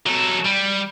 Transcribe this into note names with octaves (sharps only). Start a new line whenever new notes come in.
F#3 A4
G3